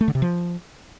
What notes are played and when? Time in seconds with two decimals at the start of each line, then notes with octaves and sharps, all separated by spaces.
0.01 A3
0.08 D3
0.15 C3
0.22 F3